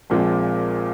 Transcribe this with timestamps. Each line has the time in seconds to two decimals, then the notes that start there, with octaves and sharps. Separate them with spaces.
0.10 A#1 A#2 F3 G#3 C4